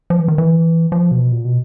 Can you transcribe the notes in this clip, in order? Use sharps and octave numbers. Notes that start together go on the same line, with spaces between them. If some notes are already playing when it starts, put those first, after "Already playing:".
F3
E3
D#3
E3
F3
B2
A#2
B2